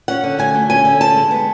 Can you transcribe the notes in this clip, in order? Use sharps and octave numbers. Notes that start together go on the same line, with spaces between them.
C#4 F#5
D3
D2 G#5
A3
C#4 G#5
D3
D2 A5
G#3
B3